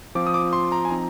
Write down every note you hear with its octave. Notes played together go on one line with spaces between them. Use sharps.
F3 C4 F4 D6
D#6
D6
C6
A#5
G#5
F3 C4 D#4 A#5